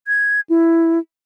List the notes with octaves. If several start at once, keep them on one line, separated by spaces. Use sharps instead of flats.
G#6
E4